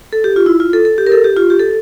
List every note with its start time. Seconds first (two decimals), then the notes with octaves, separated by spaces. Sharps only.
0.13 A4
0.24 G4
0.36 F4
0.46 E4
0.60 F4
0.73 A4
0.85 A4
0.98 G4
1.07 A#4
1.12 A4
1.24 G4
1.37 F4
1.50 G4
1.59 A4